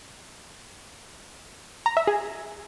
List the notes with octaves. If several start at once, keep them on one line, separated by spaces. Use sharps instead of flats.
A#5
E5
G#4